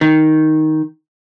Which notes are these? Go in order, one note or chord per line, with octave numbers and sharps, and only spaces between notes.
D#3